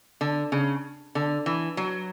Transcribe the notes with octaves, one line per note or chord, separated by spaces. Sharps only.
D3
C#3
D3
E3
F#3